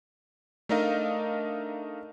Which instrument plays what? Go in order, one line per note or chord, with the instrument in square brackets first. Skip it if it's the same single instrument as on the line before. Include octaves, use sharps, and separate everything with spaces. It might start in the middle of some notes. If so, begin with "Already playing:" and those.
[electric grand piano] A3 D4 D#4 A#4 D#5 F5